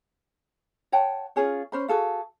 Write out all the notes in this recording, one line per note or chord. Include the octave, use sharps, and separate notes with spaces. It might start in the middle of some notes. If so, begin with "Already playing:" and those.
C#5 F#5 G5 A5
C#4 F4 G#4 C#5
C#4 C5 B5
F#4 G#4 A4 F5